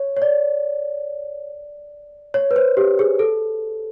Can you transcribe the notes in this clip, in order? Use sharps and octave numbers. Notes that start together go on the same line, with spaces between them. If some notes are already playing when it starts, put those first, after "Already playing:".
Already playing: C#5
C#5
D5
C#5
B4
C5
G4
G#4
A4